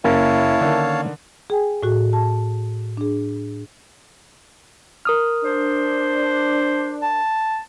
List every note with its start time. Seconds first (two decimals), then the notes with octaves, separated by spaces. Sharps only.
0.04 F#1 A#3 C#4 E4 A#4 C#5 F5 A5
0.61 D3 D#3
1.50 G#4 G5 G#5
1.83 A2 F#4 G#4
2.13 A5
2.97 D4 G#4
5.05 A#4 D#6 F6
5.45 D4 C5
7.02 A5